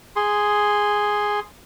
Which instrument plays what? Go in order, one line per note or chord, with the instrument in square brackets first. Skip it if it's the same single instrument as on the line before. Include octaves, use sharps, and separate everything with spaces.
[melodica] G#4 C6